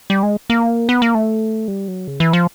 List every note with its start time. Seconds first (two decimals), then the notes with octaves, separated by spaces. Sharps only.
0.10 G3
0.23 G#3
0.50 A#3
0.89 B3
1.02 A#3
1.15 A3
1.68 G3
1.88 F#3
2.07 C#3
2.20 E3
2.33 F3